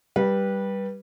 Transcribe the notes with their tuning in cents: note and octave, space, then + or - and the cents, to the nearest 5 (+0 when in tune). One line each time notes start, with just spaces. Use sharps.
G3 +0 B4 -20